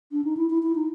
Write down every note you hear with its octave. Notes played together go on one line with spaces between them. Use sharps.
D4
D#4
E4
E4
E4
D#4